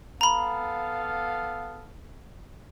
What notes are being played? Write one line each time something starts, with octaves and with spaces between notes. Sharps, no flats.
B3 A4 F5 A#5 B5